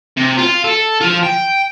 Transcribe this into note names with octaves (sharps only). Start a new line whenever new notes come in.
C3
F4
A4
F3 F4
G5